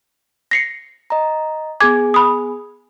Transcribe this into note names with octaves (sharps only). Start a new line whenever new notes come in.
A#6 C7 C#7
D#5 A#5
B3 G#4 G#5 D6 G#6
B5 D#6